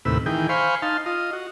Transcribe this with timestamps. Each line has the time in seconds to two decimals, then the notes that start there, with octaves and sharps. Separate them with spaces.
0.05 D#2 A2 C3 B4 E6
0.26 D#3 E3 G#4 G5
0.49 C5 F5 G#5 B5 C#6
0.82 D#4 F5 A5 C6
1.06 F4 D#5
1.33 F#4